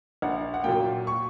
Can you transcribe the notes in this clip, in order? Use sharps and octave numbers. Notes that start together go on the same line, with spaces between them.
A#1 F#5
F#5
A#2 F#3 A#3 G5
C#6